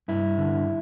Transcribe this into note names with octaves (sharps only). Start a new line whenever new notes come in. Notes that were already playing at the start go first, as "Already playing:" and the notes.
G2 E4
D3